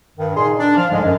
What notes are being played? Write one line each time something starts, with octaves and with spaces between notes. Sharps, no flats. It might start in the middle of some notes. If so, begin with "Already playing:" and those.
G2 D#3
A#2 C#3 D#4 G#4 C6
D4
F3 F5
C2 G#2 D3 F3 G#3
F#2